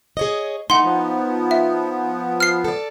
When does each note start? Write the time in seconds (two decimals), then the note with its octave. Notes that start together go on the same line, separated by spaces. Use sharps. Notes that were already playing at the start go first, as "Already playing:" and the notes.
0.17 G#4 C#5 D#5
0.70 A3 D#4 F#5 C6
0.83 F3 B3
1.51 E5
2.40 F6 C7
2.64 A4 D5